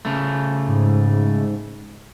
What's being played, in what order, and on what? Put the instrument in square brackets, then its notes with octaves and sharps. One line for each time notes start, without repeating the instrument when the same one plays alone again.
[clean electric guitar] C#3 A3
[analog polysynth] G#2